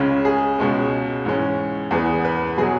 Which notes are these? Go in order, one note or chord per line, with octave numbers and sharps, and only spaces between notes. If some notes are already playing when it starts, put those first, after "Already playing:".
Already playing: C#2 C#3 G#3 C#4
G#4
C#2 B2 G#3 C#4
G#2 E3 G#3 C#4
E2 E3 B3 G#4
B4
B2 F#3 B3 G#4